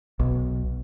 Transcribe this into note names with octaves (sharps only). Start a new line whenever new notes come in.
B1